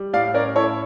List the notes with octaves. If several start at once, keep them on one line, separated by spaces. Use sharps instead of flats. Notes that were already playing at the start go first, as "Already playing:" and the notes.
Already playing: G3
A2 D5 F5
C#4 A#4 D5
E4 A4 C#5